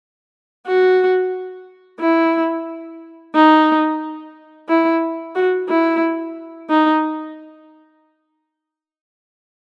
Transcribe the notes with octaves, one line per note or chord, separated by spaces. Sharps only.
F#4
E4
D#4
E4
F#4
E4
D#4